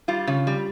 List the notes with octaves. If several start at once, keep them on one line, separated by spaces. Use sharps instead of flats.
G3 F4
C#3
G3